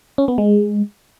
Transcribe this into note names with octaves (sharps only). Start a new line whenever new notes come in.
C#4
B3
G#3